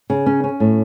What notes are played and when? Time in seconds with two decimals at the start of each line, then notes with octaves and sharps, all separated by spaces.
0.10 C#3
0.26 C#4
0.44 C#4
0.60 A2